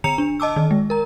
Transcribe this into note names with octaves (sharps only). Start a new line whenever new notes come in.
D3 A#5 C#7 F7
D4
D#5 A5 D6 E6
D#3
G#3
A#4 A#5